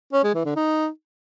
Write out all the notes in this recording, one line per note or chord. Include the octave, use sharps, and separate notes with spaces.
C#4
G#3
E3
D3
D#4